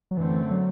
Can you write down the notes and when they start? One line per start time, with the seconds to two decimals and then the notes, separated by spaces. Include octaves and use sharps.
0.11 F#3
0.17 F#2 D3 E3 A3 C4
0.51 F#3